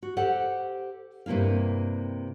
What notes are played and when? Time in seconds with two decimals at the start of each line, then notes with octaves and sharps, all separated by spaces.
0.03 F#4
0.17 G4 A4 C5 F#5
1.26 G2 C3 A#3 E4 F5